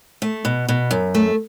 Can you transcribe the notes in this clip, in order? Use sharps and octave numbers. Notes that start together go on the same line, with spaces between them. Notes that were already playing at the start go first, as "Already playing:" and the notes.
A3
B2
B2
F#2
A3